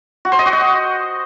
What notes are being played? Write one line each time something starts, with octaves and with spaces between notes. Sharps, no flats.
F#4
C5
D#5
F#4
D#5